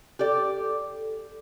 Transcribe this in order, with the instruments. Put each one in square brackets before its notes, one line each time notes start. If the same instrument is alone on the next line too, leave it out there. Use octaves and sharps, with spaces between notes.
[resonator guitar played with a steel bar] G4 D5 [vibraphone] A4